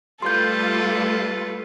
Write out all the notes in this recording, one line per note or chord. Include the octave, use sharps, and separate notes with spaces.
G3 A3 F4 A4 B4 C6 G6